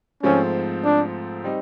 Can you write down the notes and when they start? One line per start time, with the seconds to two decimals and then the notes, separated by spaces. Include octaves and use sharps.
0.23 G#2 F3 A3 C4 C#4
0.84 D4
1.44 G3 C4 D#4